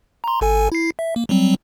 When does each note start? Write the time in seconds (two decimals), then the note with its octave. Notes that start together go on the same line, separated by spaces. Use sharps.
0.24 A#5 C6
0.41 G#1 A4 G#5
0.72 E4 C7
0.99 E5
1.16 A#3
1.29 F#3 G3 C4